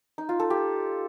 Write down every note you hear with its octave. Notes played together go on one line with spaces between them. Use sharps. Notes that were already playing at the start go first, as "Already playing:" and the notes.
D#4
F4
A4
G4